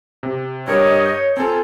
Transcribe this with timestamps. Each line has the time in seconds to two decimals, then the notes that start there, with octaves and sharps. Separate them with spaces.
0.23 C3
0.67 G2 G4 A#4 C#5 D#5
1.06 G6
1.37 C4 F4 A4 G#5 A#5